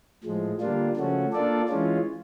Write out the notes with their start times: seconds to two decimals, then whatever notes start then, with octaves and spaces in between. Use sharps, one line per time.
0.24 A2 F3 G#3
0.60 D3 G3 A#3 D4 F4
0.96 C#3 F3 A3 C#4 F#4
1.32 A#3 D4 F4 A4 D5
1.68 E3 G#3 C#4 F4